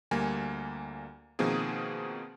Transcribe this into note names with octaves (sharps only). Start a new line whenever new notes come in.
D2 G3 A#3 G#5
B2 D#3 F3 A#3 C4 G#4